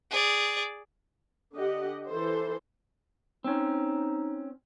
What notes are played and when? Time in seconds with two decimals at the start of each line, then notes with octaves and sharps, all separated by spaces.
0.11 G#4 D5
1.55 D3 G4 D#5 F#5
2.09 E3 A4 C5
3.44 C4 C#4 D#4